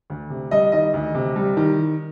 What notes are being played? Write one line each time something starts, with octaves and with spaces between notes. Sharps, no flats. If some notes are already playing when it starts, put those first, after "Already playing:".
D2
C3
G3 D#5
D#3 D#5
D2
C3
G3
D#3